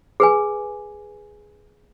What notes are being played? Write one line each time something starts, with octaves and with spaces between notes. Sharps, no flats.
G#4 B4 G#5